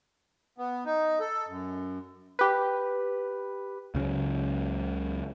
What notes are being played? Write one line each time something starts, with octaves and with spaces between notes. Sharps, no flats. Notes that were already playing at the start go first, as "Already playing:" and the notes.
B3
D#4
A4
F#2
G4 B4
C#2 C#3 F3 F#3